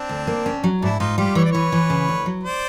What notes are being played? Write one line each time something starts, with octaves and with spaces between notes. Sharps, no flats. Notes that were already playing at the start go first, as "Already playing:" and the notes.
Already playing: C4 D4
D2
A#3
C#4
F#3
G#2 D4 E4
G#2 D#4 F4
G3 F4 G4
E3 C#5
D5
E3 B4 C#5
E3
C#3
D2
F#3
C5 D5